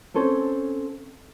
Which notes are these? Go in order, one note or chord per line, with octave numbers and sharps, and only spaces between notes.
C4 C#4 A4 C5 C#5